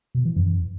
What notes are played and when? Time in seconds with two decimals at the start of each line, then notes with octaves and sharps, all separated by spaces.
0.15 B2
0.25 E3
0.36 F#2